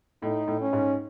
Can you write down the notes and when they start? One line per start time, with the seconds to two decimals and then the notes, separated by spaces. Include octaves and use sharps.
0.22 A2 D#4
0.48 A2
0.61 C#4
0.73 G#2